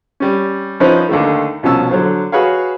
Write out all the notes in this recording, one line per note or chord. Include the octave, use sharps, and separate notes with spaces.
G3 C#4
F3 C#4 D#4 E4 B4 C5
D#2 D3 D#3 A3
C2 B2 F3 C#4 A5 E6
D3 F#3 C5
F#4 G#4 B4 C#5 F5